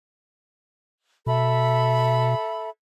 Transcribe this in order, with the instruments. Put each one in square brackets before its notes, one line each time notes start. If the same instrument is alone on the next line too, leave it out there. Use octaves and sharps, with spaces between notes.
[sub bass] B2 [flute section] A4 E5 B5